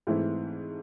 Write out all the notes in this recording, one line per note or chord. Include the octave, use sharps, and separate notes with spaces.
G#2 E3 A3 C4 E4